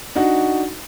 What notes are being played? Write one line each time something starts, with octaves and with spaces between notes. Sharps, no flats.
D4 D#4 F#4 F#5